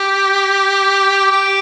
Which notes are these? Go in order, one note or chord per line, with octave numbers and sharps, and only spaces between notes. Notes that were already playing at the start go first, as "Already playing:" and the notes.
Already playing: G4
G4